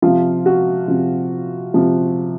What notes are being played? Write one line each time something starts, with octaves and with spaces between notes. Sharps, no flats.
C3 F3 F4
F#4
C3 F3
C3 F3